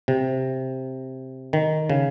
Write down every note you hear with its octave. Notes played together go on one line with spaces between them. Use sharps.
C3
D#3
C#3